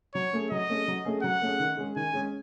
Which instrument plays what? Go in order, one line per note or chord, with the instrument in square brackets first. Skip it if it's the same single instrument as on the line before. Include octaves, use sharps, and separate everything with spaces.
[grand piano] F#3 [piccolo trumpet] C#5
[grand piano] A3 C#4 G#4
[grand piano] F#3 [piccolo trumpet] D#5
[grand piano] A3 C#4 G#4
F#3
A3 C#4 G#4
[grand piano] F#3 [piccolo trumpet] F#5
[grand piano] A3 C#4 G#4
D#3
G#3 C#4 G#4
[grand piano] D#3 [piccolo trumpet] G#5
[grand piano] G#3 C#4 G#4